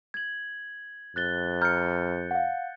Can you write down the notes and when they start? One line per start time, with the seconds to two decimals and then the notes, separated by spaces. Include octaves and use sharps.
0.14 G#6 F#7
1.16 F2 F#6 A6 G7
1.61 A#5 F6 G6 A6 C#7
2.31 F5 F#5